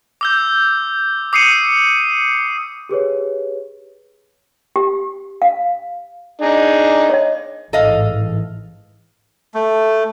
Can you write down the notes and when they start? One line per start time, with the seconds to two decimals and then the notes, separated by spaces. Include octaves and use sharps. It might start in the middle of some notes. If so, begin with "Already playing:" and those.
0.21 D6 E6 G6
1.33 D6 D#6 C7 C#7 D#7
2.89 G4 G#4 B4 C#5
4.76 G4
5.42 F5
6.42 D4 D#4 G#4
7.10 C#5 D#5
7.73 A1 G#2 E3 A4 D#5 F5
9.54 A3